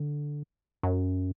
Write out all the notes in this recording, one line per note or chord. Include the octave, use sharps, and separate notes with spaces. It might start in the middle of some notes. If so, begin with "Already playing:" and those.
Already playing: D3
F#2